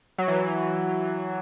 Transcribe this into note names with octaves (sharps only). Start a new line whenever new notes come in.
F#3
E3